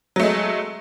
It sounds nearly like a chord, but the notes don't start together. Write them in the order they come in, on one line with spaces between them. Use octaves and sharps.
F#3 A3 G#3